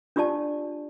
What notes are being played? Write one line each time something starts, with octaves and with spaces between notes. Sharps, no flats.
D4 F4 G4 D5 A5